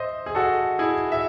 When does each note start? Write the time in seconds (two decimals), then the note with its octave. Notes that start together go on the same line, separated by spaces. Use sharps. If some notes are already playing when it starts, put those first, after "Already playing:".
Already playing: C5 D#5 E5
0.26 G#4
0.35 F#4 A4
0.79 E4 G#4
1.12 E5